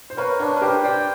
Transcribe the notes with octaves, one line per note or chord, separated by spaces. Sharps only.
C5
A#4 B4 C#5
D4 B4 C#5
B4
G4 A#4 C5
C5 D5 G5